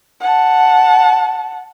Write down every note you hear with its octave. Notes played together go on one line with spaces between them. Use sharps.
F#5 A5